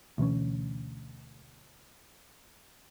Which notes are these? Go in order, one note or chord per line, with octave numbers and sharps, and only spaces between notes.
D2 B2 E3 C#4